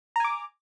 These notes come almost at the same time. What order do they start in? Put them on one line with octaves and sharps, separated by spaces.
A#5 G#5 D6